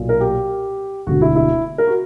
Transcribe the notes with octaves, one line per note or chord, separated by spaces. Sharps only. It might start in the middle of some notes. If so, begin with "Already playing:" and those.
Already playing: B1 A#2
A#4
G4
E1 D2 D3 F#4
E4
E4
A#4
F#4